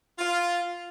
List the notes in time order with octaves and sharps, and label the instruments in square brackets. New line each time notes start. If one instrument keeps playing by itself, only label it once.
[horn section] F4